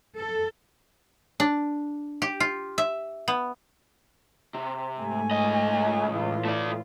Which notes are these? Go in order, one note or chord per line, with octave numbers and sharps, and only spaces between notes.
A4
D4
G4
F4
E5
B3
C3
G#2 A3 G#5
C#2 D#5
A2 E3 F4
A3 D5